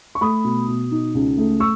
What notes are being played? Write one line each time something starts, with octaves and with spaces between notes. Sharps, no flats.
C#6
A3 B5 D#6
B2
B2
D#4
C#2
A3
C#6 E6